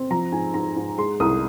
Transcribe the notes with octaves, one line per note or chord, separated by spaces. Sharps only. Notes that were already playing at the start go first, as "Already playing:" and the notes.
Already playing: C4
F3 A#5
G#2 G#5
G#2 A#5
G#2
G#3 C6
C2 D#6